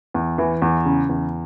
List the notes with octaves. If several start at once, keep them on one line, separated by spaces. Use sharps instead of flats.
E2
E3
E2
C#3
E2